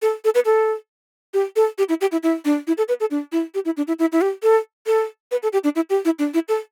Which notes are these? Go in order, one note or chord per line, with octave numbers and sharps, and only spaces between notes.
A4
A4
B4
A4
G4
A4
G4
E4
G4
E4
E4
D4
E4
A4
B4
A4
D4
E4
G4
E4
D4
E4
E4
E4
G4
A4
A4
B4
A4
G4
D4
E4
G4
E4
D4
E4
A4